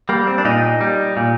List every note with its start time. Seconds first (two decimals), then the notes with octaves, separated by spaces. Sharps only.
0.09 G3 A#3
0.27 C4
0.38 D4
0.45 A#2 D#4
0.81 G3
1.17 A#2